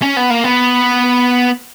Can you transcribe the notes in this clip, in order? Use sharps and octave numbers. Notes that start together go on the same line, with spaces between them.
C#4
B3
A#3
B3